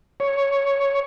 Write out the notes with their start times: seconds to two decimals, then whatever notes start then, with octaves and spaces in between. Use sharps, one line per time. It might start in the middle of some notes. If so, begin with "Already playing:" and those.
0.20 C#5